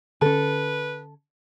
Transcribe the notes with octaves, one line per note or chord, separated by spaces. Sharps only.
D3 C#4 A4 B4